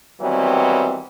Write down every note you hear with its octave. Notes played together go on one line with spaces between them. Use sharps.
D#3 E3 F#3 G3 B3 C4